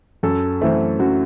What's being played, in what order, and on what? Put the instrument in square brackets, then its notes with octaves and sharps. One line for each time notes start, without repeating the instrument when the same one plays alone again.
[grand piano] F#2 A4
E3 A3 C4
F#2 F#4